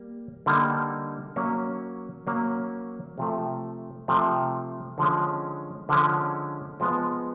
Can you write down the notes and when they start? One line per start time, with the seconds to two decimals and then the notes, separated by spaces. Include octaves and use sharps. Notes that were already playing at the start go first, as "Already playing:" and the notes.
Already playing: G3 A#3
0.46 D3 G3 A#3 D#4
1.36 F#3 A#3 C#4
2.27 F#3 A#3 C#4
3.18 C3 F3 A3
4.08 C3 F3 A3
4.98 D3 F3 G#3 C#4
5.89 D3 F3 G#3 C#4
6.80 F3 G#3 B3